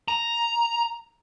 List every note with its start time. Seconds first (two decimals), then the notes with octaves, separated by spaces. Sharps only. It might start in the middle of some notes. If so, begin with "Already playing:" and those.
0.08 A#5